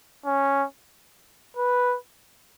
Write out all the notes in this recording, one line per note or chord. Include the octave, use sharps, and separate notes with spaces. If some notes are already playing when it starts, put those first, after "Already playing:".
C#4
B4